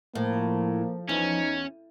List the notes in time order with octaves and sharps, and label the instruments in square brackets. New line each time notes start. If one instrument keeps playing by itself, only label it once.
[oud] A2 [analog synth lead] F3 [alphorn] A#3
[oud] E2 [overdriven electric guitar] C#4 [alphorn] D#4